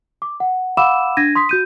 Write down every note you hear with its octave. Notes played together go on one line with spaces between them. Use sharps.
D6
F#5
F5 F#5 B5 D6 E6 E7
D4 G#6 A#6 D#7
C6 D#6 B6
F#4 G6 D#7